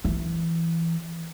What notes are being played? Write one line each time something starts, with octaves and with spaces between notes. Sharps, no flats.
E3